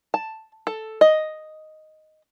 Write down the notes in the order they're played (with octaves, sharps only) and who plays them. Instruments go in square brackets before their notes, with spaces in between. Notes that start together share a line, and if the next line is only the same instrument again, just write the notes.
[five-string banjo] A5
A4
D#5